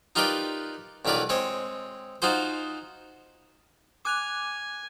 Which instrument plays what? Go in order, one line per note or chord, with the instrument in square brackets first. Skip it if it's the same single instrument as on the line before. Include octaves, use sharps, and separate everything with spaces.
[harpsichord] D#4 F4 G4 A#4 B4 D5
B1 G2 E3 A#4 B4 D5
G#3 C4 C#5
D#4 F4 F#4 G#4 C5
[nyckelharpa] G#5 [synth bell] D6 F#6 F7